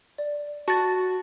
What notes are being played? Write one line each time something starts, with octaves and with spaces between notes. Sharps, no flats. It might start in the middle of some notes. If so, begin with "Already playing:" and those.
D5
F#4 A5 A6